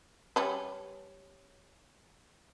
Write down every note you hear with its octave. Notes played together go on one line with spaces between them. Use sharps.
G3 C#4 B4